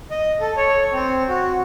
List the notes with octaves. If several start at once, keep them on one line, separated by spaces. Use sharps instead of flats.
D#5
A4
C#5
C4
F#4